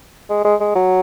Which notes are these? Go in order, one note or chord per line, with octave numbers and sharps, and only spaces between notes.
G#3
G#3
G#3
F#3